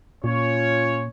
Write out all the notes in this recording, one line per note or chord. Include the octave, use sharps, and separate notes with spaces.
A#2 C#4 F4 C#5